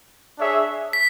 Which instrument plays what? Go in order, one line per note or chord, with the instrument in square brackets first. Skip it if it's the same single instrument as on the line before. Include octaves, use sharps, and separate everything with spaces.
[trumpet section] D4 G#4 C#5 E5
[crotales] B6